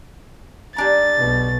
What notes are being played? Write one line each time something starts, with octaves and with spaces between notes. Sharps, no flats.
G3 D4 A#5 A6
B1 B2